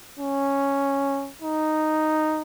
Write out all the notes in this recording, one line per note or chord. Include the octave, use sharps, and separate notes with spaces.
C#4
D#4